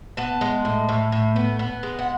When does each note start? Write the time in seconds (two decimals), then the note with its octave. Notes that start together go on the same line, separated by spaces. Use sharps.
0.17 B3 A5
0.41 G#3
0.65 A2
0.89 A2
1.12 A2
1.36 B3
1.59 B3
1.83 G#3
1.99 F#5